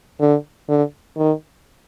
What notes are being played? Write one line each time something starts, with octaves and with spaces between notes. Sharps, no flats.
D3
D3
D#3